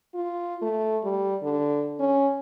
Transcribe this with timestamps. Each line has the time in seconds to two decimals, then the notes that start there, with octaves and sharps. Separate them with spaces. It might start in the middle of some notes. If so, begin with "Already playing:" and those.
0.15 F4
0.62 A3
1.04 G3
1.43 D3
2.00 C#4